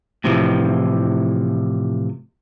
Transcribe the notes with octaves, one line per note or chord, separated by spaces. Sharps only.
A2 C3 E3 F3